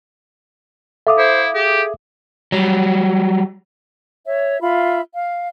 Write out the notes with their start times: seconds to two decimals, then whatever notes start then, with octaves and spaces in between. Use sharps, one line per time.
1.07 A4 E5 F5 D6 D#6
1.18 E4 C5
1.55 G4 G#4
2.52 F#3 G3
4.25 C#5 E5
4.61 F4 E5 B5
5.13 F5